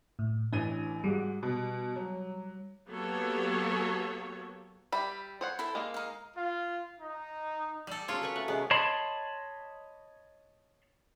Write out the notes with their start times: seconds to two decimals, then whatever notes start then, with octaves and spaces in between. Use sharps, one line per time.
0.19 A2
0.53 A1 E3 D4 D#7
1.04 G#2 G3 F#4
1.43 B2
1.96 F#3
2.89 F#3 A#3 B3 G4 A4 C#5
4.92 G3 E5 B5
5.41 C5 C#5 F#5
5.59 E4 A4
5.75 G#3 A#3
5.94 D#4 F5
6.37 F4
7.00 D#4
7.87 G3 A4
8.08 F#3 C#4 F4 G#4 C#5
8.22 A4 B4 C#6
8.36 A3 F#5
8.48 C3 G#3 B3 C#4
8.71 C#5 D#5 A5 B5 C6